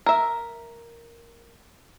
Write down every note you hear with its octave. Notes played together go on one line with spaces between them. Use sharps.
A#4 E5